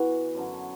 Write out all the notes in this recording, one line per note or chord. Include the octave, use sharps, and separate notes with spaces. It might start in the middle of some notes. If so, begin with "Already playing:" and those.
Already playing: E3 B3 F#4
F#2 D3 F#3